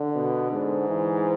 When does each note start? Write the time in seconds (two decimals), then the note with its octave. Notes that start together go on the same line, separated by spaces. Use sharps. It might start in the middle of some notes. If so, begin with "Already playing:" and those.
Already playing: D3
0.15 B2
0.52 G#2
0.88 E3